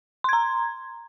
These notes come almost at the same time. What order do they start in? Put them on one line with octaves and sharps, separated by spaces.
C6 G#6 A#5